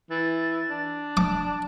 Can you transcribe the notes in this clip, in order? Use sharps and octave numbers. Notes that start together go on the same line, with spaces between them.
E3 A6
D4
A5 D6